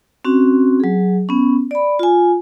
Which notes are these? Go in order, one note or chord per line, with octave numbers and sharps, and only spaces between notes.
C4 C#4 F#4
F#3 G#4
B3 C#4
D5 B5
F4 G#5